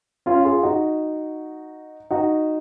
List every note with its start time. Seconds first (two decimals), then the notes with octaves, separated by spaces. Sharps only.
0.26 C#4 F4
0.45 F4 G#4
0.63 D#4 F#4
2.11 D#4 F#4